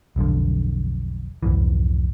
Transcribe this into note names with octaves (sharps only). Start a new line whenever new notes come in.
E1 B1 F2 D3
C2 F2 G#2 E3